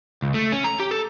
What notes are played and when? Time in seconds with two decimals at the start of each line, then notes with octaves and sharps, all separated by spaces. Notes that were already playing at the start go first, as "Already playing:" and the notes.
0.22 C#2
0.34 A3
0.52 C#4
0.64 A#5
0.80 G4
0.91 A4